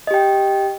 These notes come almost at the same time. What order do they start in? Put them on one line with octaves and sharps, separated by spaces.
D#5 G4 G5